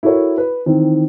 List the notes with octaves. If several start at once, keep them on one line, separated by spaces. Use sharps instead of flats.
E4 F#4 A4 A#4 C#5 E5
B4
D#3 E3 C4